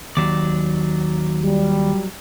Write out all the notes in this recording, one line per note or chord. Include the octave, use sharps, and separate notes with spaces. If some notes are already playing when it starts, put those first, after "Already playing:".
D#2 F#3 D5
G3